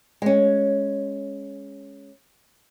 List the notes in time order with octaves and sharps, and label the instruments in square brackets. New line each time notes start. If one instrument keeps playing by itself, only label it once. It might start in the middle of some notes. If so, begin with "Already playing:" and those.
[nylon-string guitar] G#3 C#4